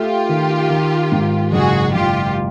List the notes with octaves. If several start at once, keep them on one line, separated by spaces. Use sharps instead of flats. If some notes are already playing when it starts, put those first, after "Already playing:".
Already playing: A3 F4 G4
D#3
D#3
G#2
F#1 F#4 G#4
F#1 F4 G4